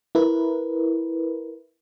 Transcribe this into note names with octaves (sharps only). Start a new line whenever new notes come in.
E4 A#4 B4